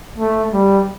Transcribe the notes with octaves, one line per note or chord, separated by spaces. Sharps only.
A3
G3